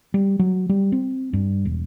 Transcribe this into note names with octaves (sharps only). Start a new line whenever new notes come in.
G3
F#3
G3
C4
G2
E1